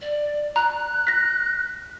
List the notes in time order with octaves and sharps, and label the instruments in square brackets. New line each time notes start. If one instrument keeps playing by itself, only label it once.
[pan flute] D5
[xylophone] A#5 [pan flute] F#6
[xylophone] A#6 B6